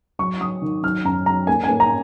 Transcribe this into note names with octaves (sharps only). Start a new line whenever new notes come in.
F#3 C#6
F#3 D#6
D#3
F#3 F6
F#2 A#5
F#3 A#5
A#3 G#5
G#5
A#3
A#5